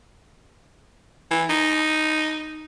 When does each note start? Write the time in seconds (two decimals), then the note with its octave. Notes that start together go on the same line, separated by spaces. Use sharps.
1.31 E3
1.50 D#4